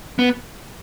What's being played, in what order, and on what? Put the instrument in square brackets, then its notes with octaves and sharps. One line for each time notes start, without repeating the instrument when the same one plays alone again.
[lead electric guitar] B3